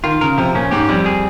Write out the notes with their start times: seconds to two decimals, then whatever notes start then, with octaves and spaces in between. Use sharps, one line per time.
0.04 D#3 F4
0.21 C#3 A#4
0.38 C3 F3
0.55 A#2 C#4
0.71 G#2 G4
0.89 F2 G3
1.06 G#4